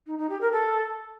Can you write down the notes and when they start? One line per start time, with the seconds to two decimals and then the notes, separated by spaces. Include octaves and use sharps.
0.07 D#4
0.18 D#4
0.29 G4
0.41 A#4
0.52 A4